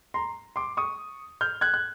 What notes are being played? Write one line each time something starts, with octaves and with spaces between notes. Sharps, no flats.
A#5 C6
C6 D6
C#6 D#6
F6 G6
F#6 G#6
F#6